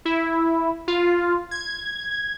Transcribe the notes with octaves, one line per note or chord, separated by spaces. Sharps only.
E4
F4
G#6